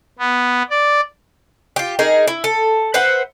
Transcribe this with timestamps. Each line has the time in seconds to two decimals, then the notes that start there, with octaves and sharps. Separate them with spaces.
0.19 B3
0.70 D5
1.76 F4 G4
1.99 D#4 G#4 A#4
2.27 E4
2.44 A4
2.94 B4 C5 E5 F#5